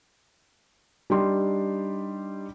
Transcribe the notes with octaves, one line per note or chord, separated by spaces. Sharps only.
G3 D4 D#4 G4 C6